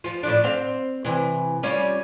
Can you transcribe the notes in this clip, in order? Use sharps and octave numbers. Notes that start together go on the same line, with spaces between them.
F3 F4
A2 F3 D4
C4 F5
C3 E3
G3 C#4 F4